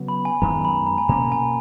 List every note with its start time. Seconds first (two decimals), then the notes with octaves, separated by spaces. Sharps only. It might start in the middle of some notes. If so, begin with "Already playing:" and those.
Already playing: C#3 F#3 B3
0.08 B5
0.25 G#5
0.42 F#2 D#3 G#3 B3 A#5
0.65 B5
0.87 A#5
0.98 G#5
1.09 B2 A#3 C#4 A#5
1.32 G#5